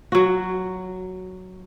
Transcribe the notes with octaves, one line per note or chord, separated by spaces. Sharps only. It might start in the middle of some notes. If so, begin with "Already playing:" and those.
F#3 F#4